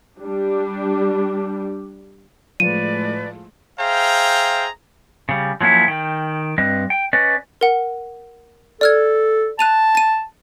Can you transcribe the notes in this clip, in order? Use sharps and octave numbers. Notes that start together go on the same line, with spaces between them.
G3 D4 G4
A2 F3 G#3 A3 B4 D5 D#7
G#4 C5 E5 F5 G5 A#5
C#3 G3
F3 F#3 A#3 C#4 E4
D#3 G5
G2 G3 C4 B4 D#5
G5
C#4 B4 D5 D#5
A#4 F#5
A4 D5 F6 G#6
A5 F#6 D#7 F7
A6 D#7